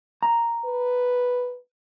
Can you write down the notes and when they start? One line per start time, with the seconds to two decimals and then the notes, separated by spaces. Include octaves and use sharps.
0.23 A#5
0.65 B4